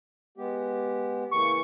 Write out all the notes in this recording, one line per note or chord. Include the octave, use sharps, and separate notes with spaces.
G#3 B3 G4
C#3 E3 A#3 C#6